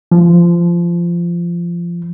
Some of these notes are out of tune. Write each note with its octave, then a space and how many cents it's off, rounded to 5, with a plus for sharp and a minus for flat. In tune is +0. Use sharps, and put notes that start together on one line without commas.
F3 -20